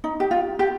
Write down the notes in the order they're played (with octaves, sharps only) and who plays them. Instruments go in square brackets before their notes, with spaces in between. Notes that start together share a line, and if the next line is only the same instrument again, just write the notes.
[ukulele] D#4
G4
F4
G4